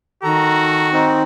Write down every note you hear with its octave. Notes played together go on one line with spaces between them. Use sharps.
D#3 F#4 A4 A#5
C4 D#4